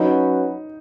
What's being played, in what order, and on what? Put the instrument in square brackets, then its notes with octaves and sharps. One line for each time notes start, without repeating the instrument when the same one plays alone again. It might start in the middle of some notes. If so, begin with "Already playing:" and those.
Already playing: [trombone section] F#3 C#4 F#4 B4 [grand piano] D#4